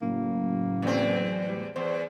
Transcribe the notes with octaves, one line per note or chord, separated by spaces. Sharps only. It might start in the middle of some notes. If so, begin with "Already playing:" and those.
F#1 A2 F#3 A#3
E2 C4
G3
E2 C5